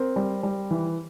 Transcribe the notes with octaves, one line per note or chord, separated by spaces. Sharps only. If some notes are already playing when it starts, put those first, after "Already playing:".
Already playing: C4 A#4 C5
G3
G3
E3